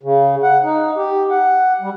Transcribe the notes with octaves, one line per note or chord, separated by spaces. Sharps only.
C#3
F#5
D#4
G4
F#5
G3